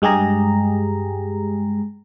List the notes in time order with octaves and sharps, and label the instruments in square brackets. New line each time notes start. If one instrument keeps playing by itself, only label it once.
[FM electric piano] G2 G#3 G4 G#4 A#5